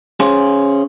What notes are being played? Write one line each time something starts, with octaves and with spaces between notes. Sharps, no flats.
C#4 G#4 C5